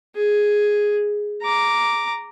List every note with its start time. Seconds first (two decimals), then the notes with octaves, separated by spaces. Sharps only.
0.16 G#4
1.42 A#5 D6